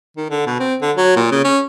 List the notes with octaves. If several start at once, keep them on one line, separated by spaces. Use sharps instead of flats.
D#3
D3
B2
C4
D3
F#3
A#2
C#3
C#4